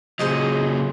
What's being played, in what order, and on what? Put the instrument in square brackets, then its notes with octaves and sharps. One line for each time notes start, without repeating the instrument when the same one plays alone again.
[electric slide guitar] A#2 C#3 F#3 [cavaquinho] G#4 C5 D#5